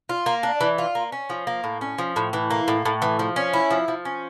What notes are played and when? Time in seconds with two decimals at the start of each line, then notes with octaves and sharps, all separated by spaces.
0.09 F4
0.26 A#3
0.43 D4
0.61 E3
0.78 F4
0.95 A#3
1.12 C#4
1.30 F3
1.47 A#3
1.64 A2
1.81 C#4
1.98 F3
2.16 A2
2.33 E3
2.50 A#3
2.68 A2
2.85 A2
3.02 E3
3.19 F3
3.36 C#4
3.53 E4
3.71 F3
3.88 F3
4.05 C#4